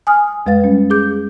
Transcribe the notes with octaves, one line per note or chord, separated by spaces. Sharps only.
G#5 D#6 F6
F2 G#3 B4 F5 A6
G3 C#4
G#4 D6 G6